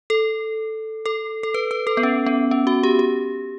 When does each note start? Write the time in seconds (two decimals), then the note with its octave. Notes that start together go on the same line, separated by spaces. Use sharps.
0.10 A4
1.06 A4
1.43 A4
1.54 B4
1.71 B4
1.87 A4
1.97 B3
2.03 C#4
2.26 B3
2.51 C#4
2.67 F#4
2.83 G4
2.99 G4